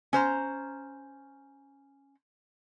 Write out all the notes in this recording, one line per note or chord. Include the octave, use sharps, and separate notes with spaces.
C#4 C5 A#5